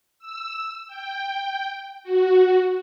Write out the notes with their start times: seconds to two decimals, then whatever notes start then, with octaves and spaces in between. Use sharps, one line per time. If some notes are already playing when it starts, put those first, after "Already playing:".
0.19 E6
0.88 G5
2.03 F#4